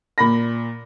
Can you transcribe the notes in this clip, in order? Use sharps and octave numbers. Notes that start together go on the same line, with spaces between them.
A#2 B5 A#6